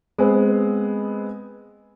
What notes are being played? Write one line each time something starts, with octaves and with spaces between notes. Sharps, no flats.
G#3 B3 C4